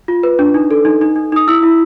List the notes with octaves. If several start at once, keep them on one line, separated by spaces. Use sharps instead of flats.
F4
B4
D4
D#4
A4
D#4
D#4
D#4
D#4 D#6
E4 E6
E4